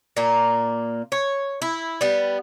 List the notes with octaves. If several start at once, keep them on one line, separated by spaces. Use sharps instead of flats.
A#2 A#3
C#5
E4
G3 B3